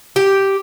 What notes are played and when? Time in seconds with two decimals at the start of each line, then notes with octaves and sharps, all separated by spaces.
0.16 G4